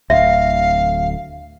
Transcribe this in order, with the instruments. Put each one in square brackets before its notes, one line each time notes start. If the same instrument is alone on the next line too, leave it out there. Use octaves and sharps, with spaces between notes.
[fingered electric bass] D1 D2 [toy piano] E5 [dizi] F5